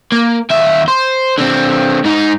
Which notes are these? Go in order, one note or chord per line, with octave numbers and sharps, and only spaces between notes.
A#3
D#2 E5
C5
D3 C4
G#2 D#4